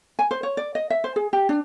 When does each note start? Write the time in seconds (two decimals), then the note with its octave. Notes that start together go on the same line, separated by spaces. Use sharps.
0.19 G#5
0.31 C5
0.43 C#5
0.57 D5
0.75 D#5
0.90 E5
1.04 C5
1.16 G#4
1.33 G4
1.49 D4